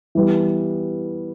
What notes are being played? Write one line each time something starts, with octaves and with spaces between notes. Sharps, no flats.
E3 G3 B3